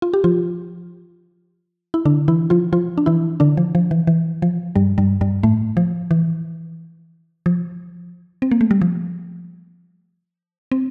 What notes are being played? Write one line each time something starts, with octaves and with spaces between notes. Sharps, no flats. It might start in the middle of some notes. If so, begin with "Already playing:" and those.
F4
G4
F3 F4
E4
D3 D4
E3 E4
F3 F4
F3 F4
D4
E3 E4
D3 D4
F3
F3
E3
E3
F3
G2 G3
G2 G3
G2 G3
A2 A3
F3
E3
F3
C4
A#3
A3
G3
F3
C4